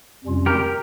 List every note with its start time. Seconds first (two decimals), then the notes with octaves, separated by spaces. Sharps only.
0.24 F2 C3 G3 C#4 F4
0.46 G4 A#4